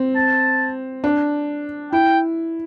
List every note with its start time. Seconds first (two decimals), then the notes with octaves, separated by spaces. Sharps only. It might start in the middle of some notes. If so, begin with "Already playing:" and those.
Already playing: C4
0.15 A5
1.04 D4
1.92 E4 G5